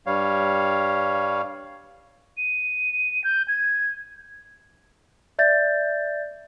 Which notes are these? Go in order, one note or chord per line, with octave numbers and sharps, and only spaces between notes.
G2 G3 C#5 F5
D#7
G6
G#6
D5 E5 G6 A6